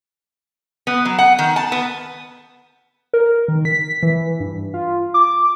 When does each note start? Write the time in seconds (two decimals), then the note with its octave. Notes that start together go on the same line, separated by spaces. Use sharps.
0.87 B3
1.05 F#3
1.19 F#5
1.39 D#3
1.56 A5
1.72 B3
3.14 A#4
3.48 D#3
3.65 B6
4.03 E3
4.40 G2
4.74 F4
5.14 D6